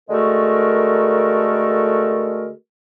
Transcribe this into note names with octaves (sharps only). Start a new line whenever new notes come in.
D3 G#3 A3 F#4 A4 A#4